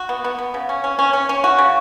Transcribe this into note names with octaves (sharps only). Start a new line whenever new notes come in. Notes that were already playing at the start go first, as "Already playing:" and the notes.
Already playing: F#4
B3
B3
B3
C#3
C#4
C#4
C#4
C#4
C#4
F#4
C#3